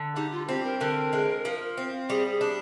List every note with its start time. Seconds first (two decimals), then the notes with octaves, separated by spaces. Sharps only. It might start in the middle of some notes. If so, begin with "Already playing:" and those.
Already playing: D3
0.16 G3 D#4
0.32 F4
0.49 C4 G4
0.64 A#4
0.80 D3 A#4
1.13 G#3
1.45 F3
1.78 C4
2.09 G3 G#4
2.31 G#4
2.41 D4